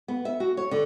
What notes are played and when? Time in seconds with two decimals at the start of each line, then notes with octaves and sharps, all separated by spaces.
0.08 B3
0.25 E5
0.40 F#4
0.57 C#5
0.71 D3